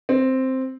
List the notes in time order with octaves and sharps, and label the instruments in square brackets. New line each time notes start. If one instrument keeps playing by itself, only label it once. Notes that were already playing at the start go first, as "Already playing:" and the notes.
[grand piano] C4